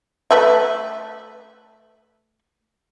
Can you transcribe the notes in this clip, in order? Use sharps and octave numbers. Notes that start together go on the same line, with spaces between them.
A3 B4 E5